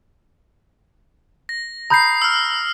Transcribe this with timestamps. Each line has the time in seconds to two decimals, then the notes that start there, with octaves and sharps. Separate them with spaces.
1.49 A#6
1.90 A#5 B5 D#6 G6 C7
2.22 E6 F6